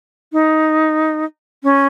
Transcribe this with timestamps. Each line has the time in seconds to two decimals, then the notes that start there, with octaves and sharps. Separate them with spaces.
0.33 D#4
1.64 C#4